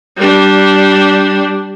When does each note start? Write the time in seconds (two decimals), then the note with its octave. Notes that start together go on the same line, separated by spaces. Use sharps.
0.17 G3 D4